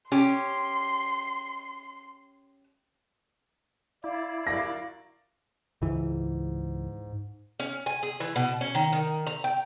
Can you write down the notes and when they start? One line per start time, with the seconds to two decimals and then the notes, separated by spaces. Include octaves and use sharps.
0.12 C#4 G4 C6
4.04 E4 D5 F5
4.47 F#4 A#4 D5 A#6
5.82 C#2 G#2 E3
7.60 C#4
7.86 G#5
8.03 G#4
8.20 E3
8.36 B2
8.61 C#4
8.75 D#3
8.92 D#3
9.27 A#5
9.44 G5